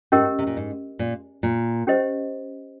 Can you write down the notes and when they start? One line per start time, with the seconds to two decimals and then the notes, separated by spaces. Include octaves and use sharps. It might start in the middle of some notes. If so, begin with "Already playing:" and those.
0.12 G#2 C#4 G4 A#4 D#5
0.39 C3
0.47 A#2
0.57 G#2
0.99 A#2
1.43 A#2
1.87 C#4 G4 C5 D#5